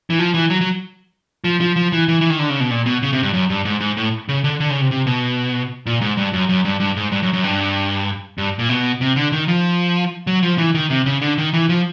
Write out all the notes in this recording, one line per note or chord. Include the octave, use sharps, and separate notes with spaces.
E3
F3
E3
F#3
F#3
F3
F3
F3
E3
E3
E3
D#3
D3
C#3
B2
A#2
B2
C#3
C3
G2
F#2
G2
G#2
G#2
A2
C#3
D3
D3
C#3
C3
C3
B2
A#2
G#2
G2
F#2
F#2
G2
G2
G#2
G2
F#2
F#2
G2
G2
A#2
B2
C3
D3
D#3
F3
F#3
F3
E3
D#3
C3
C#3
D3
D#3
E3
F3